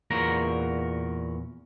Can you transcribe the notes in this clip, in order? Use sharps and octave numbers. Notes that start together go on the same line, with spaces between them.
E2 A#2 F#4 A#4 A#5